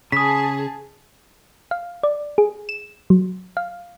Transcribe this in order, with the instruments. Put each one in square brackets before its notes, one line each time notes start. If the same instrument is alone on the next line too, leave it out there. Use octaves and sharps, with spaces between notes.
[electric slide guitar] C#3 [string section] G#4 A5 [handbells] D#6 B6
[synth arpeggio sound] F5
D5
G#4
E7
F#3
F5